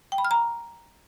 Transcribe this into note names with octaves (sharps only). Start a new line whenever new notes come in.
G5
B5
F6
A#5